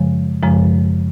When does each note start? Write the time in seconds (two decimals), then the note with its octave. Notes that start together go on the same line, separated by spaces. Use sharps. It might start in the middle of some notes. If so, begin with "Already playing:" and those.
Already playing: F#2 C#3 F3 G#3
0.43 F#2 C#3 F3 G#3